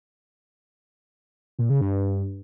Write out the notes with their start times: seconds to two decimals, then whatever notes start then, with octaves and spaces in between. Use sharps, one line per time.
1.59 A#2
1.70 C#3
1.81 G2